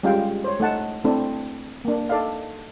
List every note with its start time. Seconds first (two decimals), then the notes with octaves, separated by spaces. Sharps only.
0.03 G3 G#3 C#4 F4 F5 G5
0.44 C5 C#5
0.60 A3 D#4 F#5 A5
1.04 A3 C4 D4 E4 A4
1.85 A#3 D4
2.09 D#4 A4 D5 E5 F5